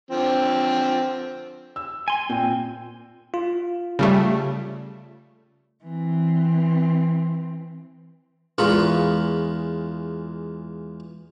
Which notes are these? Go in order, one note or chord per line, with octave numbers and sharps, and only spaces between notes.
D3 F3 C4
E6
G#5 C6
A#2 C4 G5
F4
C#3 G3 A3
E3 C4
E2 G#3 F4 A#4 B5 C#6